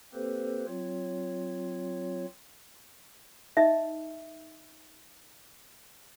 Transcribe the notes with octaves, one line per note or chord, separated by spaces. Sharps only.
A#3 C4 G4 A4 B4 C5
F#3 C4 F4 C#5
D#4 D#5 E5